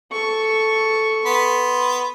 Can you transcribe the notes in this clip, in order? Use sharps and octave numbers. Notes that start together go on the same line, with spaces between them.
A4 C#6
B3 C6